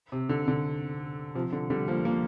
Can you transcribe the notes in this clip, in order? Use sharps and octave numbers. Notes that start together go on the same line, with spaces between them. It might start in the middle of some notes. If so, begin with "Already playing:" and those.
C3
D3
D3
C3 F3
D3
D3 G3
F3 A#3
F3 A#3